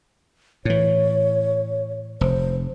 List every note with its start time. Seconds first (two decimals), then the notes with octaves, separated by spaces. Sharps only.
0.65 A2 E3 C#5
2.21 F1 C5